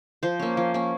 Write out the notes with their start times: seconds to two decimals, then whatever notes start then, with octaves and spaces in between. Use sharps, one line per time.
0.23 F3 C5
0.39 A#3 C#4
0.57 F3
0.74 A#3 C#4